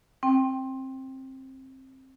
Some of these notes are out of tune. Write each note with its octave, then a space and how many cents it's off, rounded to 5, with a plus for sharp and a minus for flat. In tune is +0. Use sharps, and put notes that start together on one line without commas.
C4 +20 G5 +0